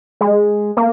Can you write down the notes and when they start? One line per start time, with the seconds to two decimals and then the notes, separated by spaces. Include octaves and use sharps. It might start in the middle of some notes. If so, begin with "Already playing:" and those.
0.21 G#3
0.77 A#3